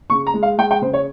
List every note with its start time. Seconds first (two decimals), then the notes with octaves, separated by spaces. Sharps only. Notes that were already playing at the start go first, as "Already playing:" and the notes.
0.10 C#3 C#6
0.27 A#5
0.34 G#3
0.43 F5
0.58 G#3 G5
0.71 G5
0.82 C#3 C5
0.93 C#5